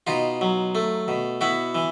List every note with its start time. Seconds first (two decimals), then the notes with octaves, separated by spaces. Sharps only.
0.07 B2 D#4 F4
0.41 F#3
0.75 A3
1.08 B2
1.41 B3 E4 F#4
1.75 E3